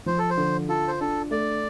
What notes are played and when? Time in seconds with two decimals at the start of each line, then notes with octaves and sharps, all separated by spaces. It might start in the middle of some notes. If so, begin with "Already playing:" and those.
0.06 F3 C5
0.18 A4
0.30 C5
0.37 D3
0.69 F4 A4
0.88 C5
1.00 D4 A4
1.31 A3 D5